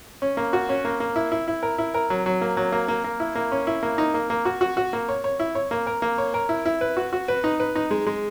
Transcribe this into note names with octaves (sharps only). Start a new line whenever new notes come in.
C#4
A#3
F#4
C#4
A#3
A#3
E4
E4
E4
A#4
E4
A#4
F#3
F#3
A#3
F#3
A#3
A#3
A#3
E4
A#3
C#4
E4
A#3
D#4
A#3
A#3
F#4
F#4
F#4
A#3
C#5
C#5
E4
C#5
A#3
A#4
A#3
C#5
A#4
E4
E4
B4
F#4
F#4
B4
D#4
B4
D#4
G#3
G#3